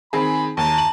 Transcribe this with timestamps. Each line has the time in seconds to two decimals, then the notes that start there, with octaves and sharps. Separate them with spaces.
0.13 D#3 C4 G#4 B5
0.57 D#2 A5 A#5
0.78 F#7